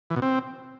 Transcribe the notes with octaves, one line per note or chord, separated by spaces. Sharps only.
E3
B2
C4